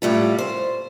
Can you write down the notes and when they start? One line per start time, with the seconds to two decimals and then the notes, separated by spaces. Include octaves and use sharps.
0.02 A2 G3 F4
0.38 C5